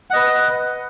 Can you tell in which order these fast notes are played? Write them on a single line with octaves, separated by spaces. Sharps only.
F#5 D#5 B4